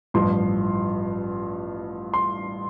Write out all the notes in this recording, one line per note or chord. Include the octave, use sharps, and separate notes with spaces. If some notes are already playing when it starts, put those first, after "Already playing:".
A1 G2 F3 C6
C6